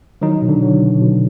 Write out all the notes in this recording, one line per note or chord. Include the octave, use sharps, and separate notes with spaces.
D#3 F#3 D#4
B2
D3 D4
F#3
B2
B2